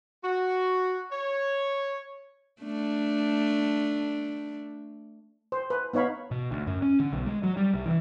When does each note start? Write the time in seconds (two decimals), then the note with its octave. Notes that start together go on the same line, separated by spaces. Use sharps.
0.23 F#4
1.12 C#5
2.62 A3 D4
5.52 C5
5.70 B4
5.93 B3 D#4 C#5 F5 B5
6.31 B2
6.52 D2
6.67 F#2
6.82 C#4
7.00 D3
7.13 B1
7.26 G#3
7.43 F#3
7.57 G3
7.74 C2
7.86 E3